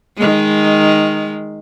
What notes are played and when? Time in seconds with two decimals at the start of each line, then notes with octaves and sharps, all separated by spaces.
0.17 D#3 G#3